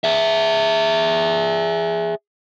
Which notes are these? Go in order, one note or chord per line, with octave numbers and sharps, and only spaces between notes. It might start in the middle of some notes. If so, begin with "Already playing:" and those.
G#4 E5